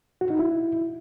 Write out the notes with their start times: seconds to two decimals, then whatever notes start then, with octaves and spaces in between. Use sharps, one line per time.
0.21 F#4
0.30 D#4
0.39 E4